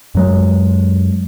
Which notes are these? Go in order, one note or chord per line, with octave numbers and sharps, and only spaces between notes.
F#2 F#3 G#3